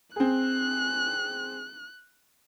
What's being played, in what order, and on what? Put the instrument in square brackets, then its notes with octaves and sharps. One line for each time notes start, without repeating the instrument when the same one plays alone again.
[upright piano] C4 G#4 [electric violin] F#6